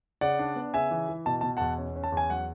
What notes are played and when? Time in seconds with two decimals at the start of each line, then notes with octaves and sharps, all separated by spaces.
0.21 C#3 D5 F#5
0.39 D4
0.56 B3
0.74 C#3 E5 G#5
0.91 E3
1.09 E3
1.26 B2 A5
1.41 B2 A5
1.57 E2 F#5 A5
1.78 C#4
1.96 C#4
2.04 A5
2.12 E2
2.17 G#5
2.30 F#3 F#5